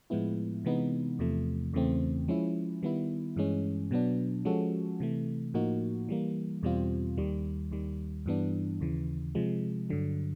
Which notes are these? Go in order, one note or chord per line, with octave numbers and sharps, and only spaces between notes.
A2 F3 G#3 B3 E4
C3 E3 G#3 B3 D#4
E2 C3 F3 A3
E2 C#3 E3 A3 C4
F3 G#3 C#4 E4
D#3 G3 B3 E4
G2 E3 G#3 C#4
B2 F#3 B3 D4
F3 G#3 C#4 F#4 A4
C3 E3 A3
A2 F3 A#3 D#4 F#4
E3 G3 A#3
E2 B2 G3 C4 F4
D#2 D#3 G3
D#2 D#3 G3
G2 E3 G3 B3 D4
D#2 C#3 E3
C3 F3 G#3
G2 D3 F#3